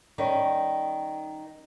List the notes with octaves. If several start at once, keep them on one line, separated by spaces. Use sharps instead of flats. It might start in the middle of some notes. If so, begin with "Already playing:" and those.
D#3 G3 C#4